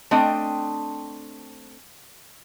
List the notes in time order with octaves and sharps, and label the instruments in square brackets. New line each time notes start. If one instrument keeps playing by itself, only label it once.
[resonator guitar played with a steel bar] A3 C4 D4 D#5 G5